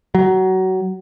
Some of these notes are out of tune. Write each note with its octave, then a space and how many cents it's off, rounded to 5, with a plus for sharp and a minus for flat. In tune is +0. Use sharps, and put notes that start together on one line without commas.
F#3 +20